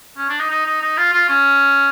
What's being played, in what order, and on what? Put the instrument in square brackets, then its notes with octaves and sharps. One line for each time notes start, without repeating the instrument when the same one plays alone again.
[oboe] C#4
D4
D#4
D#4
D#4
D#4
F4
F4
C#4